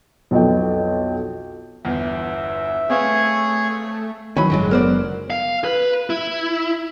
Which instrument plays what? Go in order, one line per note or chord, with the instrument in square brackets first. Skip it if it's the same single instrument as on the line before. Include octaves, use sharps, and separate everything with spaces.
[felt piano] B1 F2 B3 A4 D#5 G5
[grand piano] G1 E2 [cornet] E5
[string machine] A3 [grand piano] C4 B4 F5 [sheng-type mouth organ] G#4 C#5
[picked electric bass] D#3 E3 F#3 [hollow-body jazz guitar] C#4 B5
[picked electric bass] F#1 [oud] D3 F#3 G#3
[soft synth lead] B3 [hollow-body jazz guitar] A#4 C5 D5
[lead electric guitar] F5
B4
E4